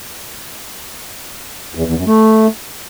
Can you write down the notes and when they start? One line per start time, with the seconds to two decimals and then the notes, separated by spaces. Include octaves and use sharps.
1.75 E2
1.85 E2
1.96 F#2
2.07 A3